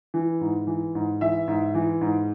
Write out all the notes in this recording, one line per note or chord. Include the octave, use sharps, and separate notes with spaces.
E3
G#2
E3
G#2
E3 E5
G#2
E3
G#2